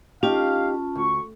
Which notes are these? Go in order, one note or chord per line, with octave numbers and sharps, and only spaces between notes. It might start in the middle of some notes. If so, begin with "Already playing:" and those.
C#4 D#4 F4 G4 F5 A5
D2 C#6